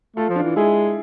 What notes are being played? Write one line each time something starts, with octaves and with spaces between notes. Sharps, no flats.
A3 F4 A4
F3
D4 F4
E3
G#3 E4 G#4